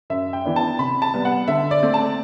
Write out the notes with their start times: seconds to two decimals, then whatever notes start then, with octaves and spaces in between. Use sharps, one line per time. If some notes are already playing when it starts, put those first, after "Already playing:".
0.10 F#2 E5
0.33 G5
0.45 E3 B3 D4
0.56 A5
0.79 C3 B5
1.02 A5
1.14 G3 B3
1.25 F#5
1.48 D3 E5
1.71 D5
1.83 A3 C4
1.94 A5